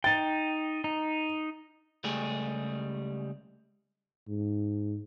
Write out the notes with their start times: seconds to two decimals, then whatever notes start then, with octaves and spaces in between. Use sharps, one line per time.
0.04 D#4 G5 A6
0.84 D#4
2.04 C#2 G3 A3 G4 G#4
4.29 G#2